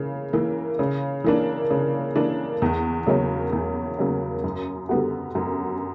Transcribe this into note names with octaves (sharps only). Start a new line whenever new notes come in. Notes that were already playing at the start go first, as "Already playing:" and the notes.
Already playing: C#3 E3 A#3
E3 A#3
C#3
E3 A#3 D4
C#3
E3 A#3 D4
E2
C#3 F#3 A#3 C#4
E2
C#3 F#3 A#3 C#4
F#2
D3 G3 B3 F#4
F#2